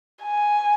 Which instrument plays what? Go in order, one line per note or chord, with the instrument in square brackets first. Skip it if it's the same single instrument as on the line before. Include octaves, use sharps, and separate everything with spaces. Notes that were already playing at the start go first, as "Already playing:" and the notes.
[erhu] G#5